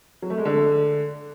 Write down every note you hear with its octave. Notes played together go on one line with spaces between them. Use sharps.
F#3
A3
G#3
D3